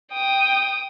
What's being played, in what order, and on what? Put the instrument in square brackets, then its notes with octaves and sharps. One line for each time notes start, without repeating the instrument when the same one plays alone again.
[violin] G5 D#6